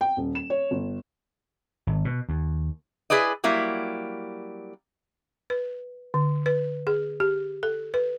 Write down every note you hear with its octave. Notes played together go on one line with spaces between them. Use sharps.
G5
D#1
E7
C#5
G1
G#1
B2
D#2
E4 G#4 B4 D5 D#5
F#3 G3 A#3 E4
B4
D3
B4
G#4
G4
A4
B4